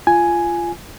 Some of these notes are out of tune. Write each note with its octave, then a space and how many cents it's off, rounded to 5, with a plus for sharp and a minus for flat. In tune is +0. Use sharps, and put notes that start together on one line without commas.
F4 -20 G#5 +5